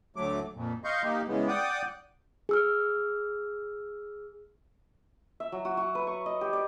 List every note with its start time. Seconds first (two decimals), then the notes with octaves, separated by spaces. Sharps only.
0.16 D2 F#3 A3 D6
0.55 F2 A#2
0.84 D#5 F5 C6 C#6 G6
1.03 A#3 D#4 G4
1.28 C#3 E3 G#3 B3
1.48 D5 F#5 G5 D6 D#6
2.49 G#4 E6 F6
5.40 E5
5.52 F#3
5.65 F#4
5.77 F#4
5.95 B4
6.07 C#6
6.26 D#5
6.41 G4
6.53 D5